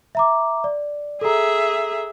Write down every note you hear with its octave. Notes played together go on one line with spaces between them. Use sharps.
E5 A#5 D6
D5
G#4 A4 E5 A#5